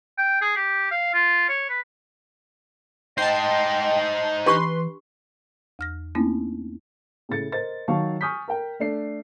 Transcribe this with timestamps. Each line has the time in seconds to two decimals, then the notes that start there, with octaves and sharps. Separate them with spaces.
0.18 G5
0.41 G#4
0.56 G4
0.91 F5
1.14 F4
1.49 C#5
1.70 B4
3.18 D#4 C5 D#5 G5 A5 C7
4.46 E3 D4 G4 B4 C6 C#6
5.79 E2 F6 A#6
6.15 A3 A#3 C4 C#4 D#4 E4
7.29 A2 C#3 A6 C#7
7.52 A#4 C5 D#5 A6
7.88 D#3 F#3 F5 A5 C#6
8.21 G#5 C#6 D#6 F6 G6 B6
8.48 A#4 G5
8.80 A3 D4 C7